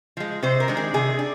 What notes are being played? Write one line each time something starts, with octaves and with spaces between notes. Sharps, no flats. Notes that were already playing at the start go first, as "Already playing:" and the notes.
F3 G#3
C3 C5
A#4
D#3 G#3 D4
G#4
C3 G#4
D4